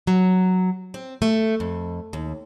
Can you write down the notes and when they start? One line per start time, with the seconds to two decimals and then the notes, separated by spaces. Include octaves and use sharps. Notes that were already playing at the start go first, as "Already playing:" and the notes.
0.07 F#3
0.94 C4
1.22 A3
1.60 F2
2.13 D#2